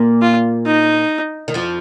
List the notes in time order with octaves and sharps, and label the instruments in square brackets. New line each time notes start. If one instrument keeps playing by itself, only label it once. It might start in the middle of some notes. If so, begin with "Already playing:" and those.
Already playing: [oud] A#2 A#3
[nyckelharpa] F4
D#4
[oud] D#3
F2 F3